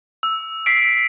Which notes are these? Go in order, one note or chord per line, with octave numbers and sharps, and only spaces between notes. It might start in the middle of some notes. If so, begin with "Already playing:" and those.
E6
E6 B6 C7 D7